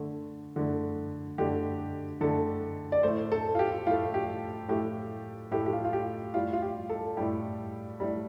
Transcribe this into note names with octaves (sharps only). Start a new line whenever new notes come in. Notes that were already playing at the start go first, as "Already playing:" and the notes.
Already playing: D3 A3
D3 A3
D3 A3 G4
D3 A3 A4
D5
A2 A3 C5
A4
F4
G4
A2 A3 F4
G4
A2 A3 G4
A2 A3 G4
G4
F4
F4
G4
A2 G3 F4
F4
G4
A4
A2 G3 G4
A2 G3